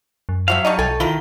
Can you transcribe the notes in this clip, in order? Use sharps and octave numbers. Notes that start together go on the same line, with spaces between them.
F#2
F3 F#3 F#4 E5 F5
G3 D4 D#4 D#5 C#6
B1 A4 G5 G#5
D#3 E4 F4 A#4 G7